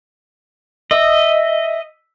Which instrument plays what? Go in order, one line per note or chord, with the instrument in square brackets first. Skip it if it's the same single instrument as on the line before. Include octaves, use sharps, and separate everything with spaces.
[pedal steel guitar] D#5 [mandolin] E5